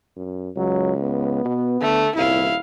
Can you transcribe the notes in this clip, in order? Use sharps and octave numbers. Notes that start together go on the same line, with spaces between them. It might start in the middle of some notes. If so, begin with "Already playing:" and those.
F#2
C#2 F#3
B3
B2
D3 A3
D#1 C2 E4 F5